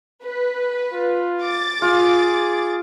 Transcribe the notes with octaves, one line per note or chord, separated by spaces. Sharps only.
B4
F4
D6 A6
F4 G#4